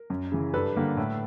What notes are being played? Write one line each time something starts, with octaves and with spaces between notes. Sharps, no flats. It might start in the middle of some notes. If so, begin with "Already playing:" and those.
Already playing: A#4
F#2
C#3 E3
G2 A4 B4
D3 G3 A#3
A2